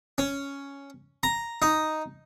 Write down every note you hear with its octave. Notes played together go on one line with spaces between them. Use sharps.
C#4
A#5
D#4